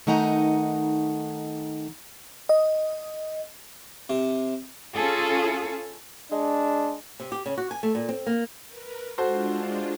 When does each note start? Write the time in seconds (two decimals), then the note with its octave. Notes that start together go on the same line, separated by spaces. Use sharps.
0.07 D#3 A3 D#4 F#5 G#5 A#5
2.49 D#5
4.09 C3
4.95 C#4 F4 G#4 A4
6.32 G#3 D4
7.20 C3
7.32 G4
7.46 C#3
7.57 F#4
7.71 G#5
7.83 A3
7.95 A#2
8.09 C4
8.26 A#3
8.67 A#4 B4
9.18 G#3 D4 F4 F#4 A4 C5